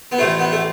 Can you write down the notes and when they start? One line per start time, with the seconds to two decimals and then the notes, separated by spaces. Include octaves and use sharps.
0.12 B3
0.18 A1 A2 F3 A3
0.40 B3
0.52 A3